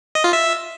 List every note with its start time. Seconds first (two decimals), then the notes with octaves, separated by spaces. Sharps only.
0.15 D#5
0.24 F4
0.33 E5